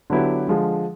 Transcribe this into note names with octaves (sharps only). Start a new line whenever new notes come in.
D3 F#3 B3 E4 G4
D3 F3 G#3